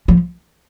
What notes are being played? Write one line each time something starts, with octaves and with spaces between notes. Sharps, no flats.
F3